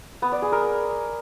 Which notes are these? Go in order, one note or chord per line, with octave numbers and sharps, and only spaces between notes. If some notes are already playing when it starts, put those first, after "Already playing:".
B3
D5
G#4
A#4